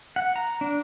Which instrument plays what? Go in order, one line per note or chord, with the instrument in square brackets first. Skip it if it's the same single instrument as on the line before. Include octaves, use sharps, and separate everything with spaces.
[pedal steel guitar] F#5
A#5
D4